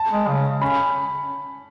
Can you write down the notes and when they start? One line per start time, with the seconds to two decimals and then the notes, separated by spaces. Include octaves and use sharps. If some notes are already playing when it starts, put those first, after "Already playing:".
Already playing: A5
0.11 G#3
0.27 C#3
0.61 C#4 B5